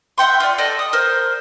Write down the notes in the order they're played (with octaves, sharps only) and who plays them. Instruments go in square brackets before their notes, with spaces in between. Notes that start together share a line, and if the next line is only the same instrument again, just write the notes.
[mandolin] E5 F#5 G5 C6
F4 D5
A4 D5 D#5
D#6
A#4 C5